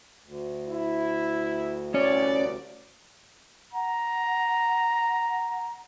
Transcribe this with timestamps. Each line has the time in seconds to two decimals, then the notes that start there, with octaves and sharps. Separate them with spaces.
0.24 D2
0.68 E4
1.94 C2 C#4 C#5 D5
3.73 F#5 A#5